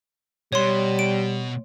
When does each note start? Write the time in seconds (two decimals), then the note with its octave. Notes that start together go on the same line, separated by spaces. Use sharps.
0.52 B2 G3 C#5 C6
0.99 D7